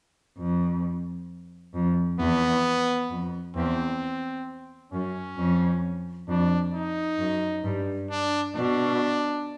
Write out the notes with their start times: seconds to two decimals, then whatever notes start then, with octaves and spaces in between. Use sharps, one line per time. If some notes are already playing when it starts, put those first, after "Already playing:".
0.38 F2
1.74 F2
2.19 E2 B3
3.10 F2
3.56 E2 C4
4.92 F#2 C#4
5.37 F2
6.28 F2 D4
6.74 D#4
7.19 F#2
7.64 G2
8.10 D4
8.55 B2 D4